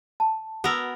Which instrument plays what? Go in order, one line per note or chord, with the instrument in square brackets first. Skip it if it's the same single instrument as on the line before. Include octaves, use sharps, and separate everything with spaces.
[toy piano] A5
[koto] B3 A#4 [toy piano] F#4 B4 E6